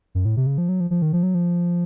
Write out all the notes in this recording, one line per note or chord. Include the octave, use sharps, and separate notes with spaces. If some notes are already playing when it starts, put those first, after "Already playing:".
F#2
A2
C3
C#3
F3
F#3
F3
F3
D#3
F3
F#3
F3